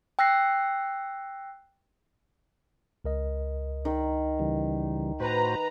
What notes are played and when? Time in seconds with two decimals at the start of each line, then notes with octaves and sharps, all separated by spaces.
0.19 G5 E6 F#6 A#6 C7
3.05 C#2 A#4 D#5
3.85 D#3
4.39 C#3 E3 G3
5.20 A2 F#4 B4 C5 A#5